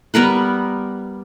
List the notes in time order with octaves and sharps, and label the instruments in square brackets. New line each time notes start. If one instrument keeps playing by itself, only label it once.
[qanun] G3 B3 A#4 B4